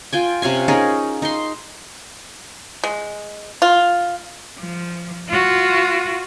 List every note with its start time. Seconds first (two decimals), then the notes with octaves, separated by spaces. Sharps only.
0.13 F4 G5 G#5
0.42 C3 C#4 F5 G#5
0.68 C#4 D#4 G#4 A#4
1.22 D#4 C6
2.84 G#3
3.62 F4
4.59 F3
5.29 F4 F#4